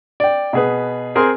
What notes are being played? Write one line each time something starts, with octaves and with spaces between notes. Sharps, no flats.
D5 G5
B2 G#4 B4
C4 G#4 A#4 C5 G#5 C6